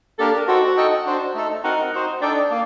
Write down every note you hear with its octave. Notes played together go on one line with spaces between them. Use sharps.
A#3 D4 G4 A4 A#4
D#4 F#4 A4 C5 G5
D#4 A4 D#5 G5
D4 F#4 C5
A3 D#4 A4
C4 D#4 F#4 A#4 F#5
D#4 F#4 C5
D4 D#4 A4 D5 G5
A#3